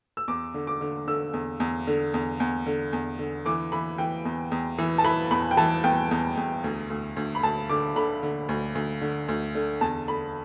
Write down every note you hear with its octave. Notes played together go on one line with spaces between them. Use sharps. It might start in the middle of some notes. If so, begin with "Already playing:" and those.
E6
E2 D6
D3
D6
D3
D3 E6
E2
E2
D3
E2
E2
D3
E2
D3
E3 D6
E3 B5
E3 G5
E2
E2
E3
A5
E3 B5
E2 B5
G5
E3 A5
E2 G5
E2
E2
D2
D2
D2
B5
D2 A5
D3 D6
D3 B5
D3
D2
D2
D3
D2
D3
E2 A5
D3 B5